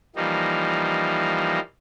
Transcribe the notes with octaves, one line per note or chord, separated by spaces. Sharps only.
E3 F3 G3 A#3 D#4